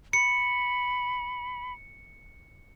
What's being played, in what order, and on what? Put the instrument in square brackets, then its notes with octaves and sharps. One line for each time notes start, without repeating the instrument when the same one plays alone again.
[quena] B5 [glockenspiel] C#7